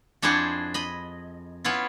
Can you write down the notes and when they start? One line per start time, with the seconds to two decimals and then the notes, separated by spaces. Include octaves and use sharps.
0.22 F2 D4 E4 G#4 C5 F#5
0.74 D#5 B5
1.64 B3 C#4 E4 F4